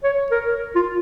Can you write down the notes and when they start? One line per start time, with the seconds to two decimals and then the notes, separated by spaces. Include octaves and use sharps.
0.04 C#5
0.31 A#4
0.75 F4